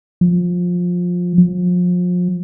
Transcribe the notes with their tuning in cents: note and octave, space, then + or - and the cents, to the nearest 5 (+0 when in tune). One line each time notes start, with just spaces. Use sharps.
F3 +20
F3 +35